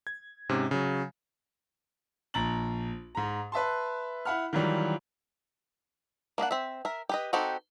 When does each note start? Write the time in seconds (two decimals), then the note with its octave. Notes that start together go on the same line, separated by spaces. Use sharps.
0.07 G#6
0.49 G#2 C3 C#4
0.71 C#3 F#3
2.34 A#1 A#5 A6 F#7
3.15 G#2 A#5
3.52 B4 E5 A5 C6
4.25 E4 F#5 B5 F6
4.53 D#3 E3 F#3 G3 F4
6.38 A#3 D4 D#5 F#5
6.51 C4 E5
6.85 A#4 E5
7.09 G4 B4 D#5
7.33 C4 D#4 F#4 G4 A4